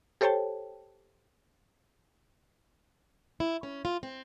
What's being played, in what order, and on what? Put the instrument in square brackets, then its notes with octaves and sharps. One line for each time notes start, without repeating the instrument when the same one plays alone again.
[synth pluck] G4 A4 C5 C#5 G5 A5
[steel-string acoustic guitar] E4
C#4
F4
C4